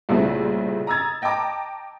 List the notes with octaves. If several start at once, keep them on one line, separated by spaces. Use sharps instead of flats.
C2 A#2 C#3 A3 C4 E4
A#5 D#6 E6 G#6 A6
D#5 G5 A5 A#5 D6